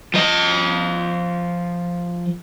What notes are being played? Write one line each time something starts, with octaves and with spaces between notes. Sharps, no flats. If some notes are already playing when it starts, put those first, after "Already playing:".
F3 D#5